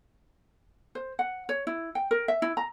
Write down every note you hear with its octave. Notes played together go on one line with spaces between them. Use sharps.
C5
F#5
C#5
E4
G5
A#4
E5
E4
A#5